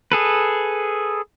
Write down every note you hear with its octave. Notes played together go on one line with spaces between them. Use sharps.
G#4 A4 B4